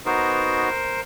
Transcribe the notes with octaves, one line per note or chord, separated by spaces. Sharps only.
B3 D#4 F#4 A#4 C5